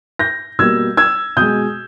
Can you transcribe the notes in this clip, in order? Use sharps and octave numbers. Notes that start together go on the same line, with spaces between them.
G6 A#6
B2 G3 A#3 E6 G#6
E6 G#6
B2 G#3 D#6 G6